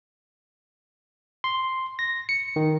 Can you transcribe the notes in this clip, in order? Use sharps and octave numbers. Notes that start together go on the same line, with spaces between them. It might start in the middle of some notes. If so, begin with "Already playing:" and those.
C6
A#6
C#7
D#3